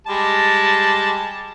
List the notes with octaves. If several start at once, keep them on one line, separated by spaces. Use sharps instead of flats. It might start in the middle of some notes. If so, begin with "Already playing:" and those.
G3 G#3 A5